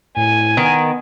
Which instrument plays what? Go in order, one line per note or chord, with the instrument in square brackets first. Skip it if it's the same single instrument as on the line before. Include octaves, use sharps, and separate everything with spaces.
[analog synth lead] A2 [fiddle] G#5
[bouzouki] D#3 [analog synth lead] B3